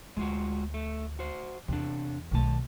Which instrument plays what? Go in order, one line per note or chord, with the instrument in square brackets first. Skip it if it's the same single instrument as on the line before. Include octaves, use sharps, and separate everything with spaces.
[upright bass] D2 [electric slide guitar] G#3 F4 F#4
[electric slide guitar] A3
F#4 C5
[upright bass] E2 [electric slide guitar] C3 D4
[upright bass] B1 A3 [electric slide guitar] D#3 A5